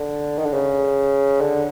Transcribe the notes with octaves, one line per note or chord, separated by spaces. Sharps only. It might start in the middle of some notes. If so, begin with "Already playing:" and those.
Already playing: D3
D#3
D3
C#3
D3